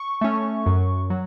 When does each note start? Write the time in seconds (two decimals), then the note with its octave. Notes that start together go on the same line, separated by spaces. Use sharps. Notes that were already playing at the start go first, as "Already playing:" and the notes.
Already playing: C#6
0.21 A3 C#4
0.66 F#2
1.10 F#3